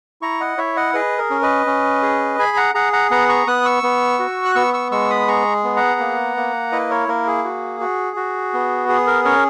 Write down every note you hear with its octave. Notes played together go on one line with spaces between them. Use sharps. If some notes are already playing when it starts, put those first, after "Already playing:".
E4 A#5 C#6
D#5 F#5
E4 C#5 E5
D#5 F#5
G#4 B4 D#5
A#4
C#4
B4 D#5
C#4
G#4
G#4 G#5 B5
F#5 A#5
G#4 F#5 A#5
F#5 A#5
B3 F#5 A#5
A#5 C#6
B3 D#6 F#6
C#6 E6
B3
F#4
F#6
B3 C#6 E6
C#6 E6
G#3 C#6 E6
B5 D#6
G#4 A#5 C#6
B3
F#5 A#5
A#3
A#3
E4 B4 D#5
A#4 C#5
A#3 A#4
G#4
F#4
F#4
F#4
B3
G#4
A#4
C#4 A#4 C#5